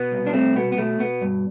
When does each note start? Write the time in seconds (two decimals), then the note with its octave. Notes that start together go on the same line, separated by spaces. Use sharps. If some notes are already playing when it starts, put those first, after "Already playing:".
Already playing: B2 B3
0.12 C2
0.26 D4
0.34 C2 A3 C4
0.56 B2 B3
0.72 B3
0.78 B2 A3
0.99 B2 B3
1.21 G2